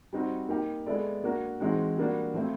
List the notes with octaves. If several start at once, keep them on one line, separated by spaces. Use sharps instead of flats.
G3 C4 D#4 F#4
A#3 D#4 G4
G#3 B3 E4 A4 D5
A#3 D4 F#4 A#4
E3 G#3 C4 D#4 F#4
G3 A#3 D4 F#4
F3 A3 C4 E4